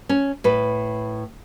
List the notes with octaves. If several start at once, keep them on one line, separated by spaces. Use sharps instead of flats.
C#4
A2 B4